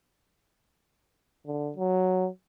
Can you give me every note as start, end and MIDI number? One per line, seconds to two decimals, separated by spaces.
1.47 1.71 50
1.77 2.28 54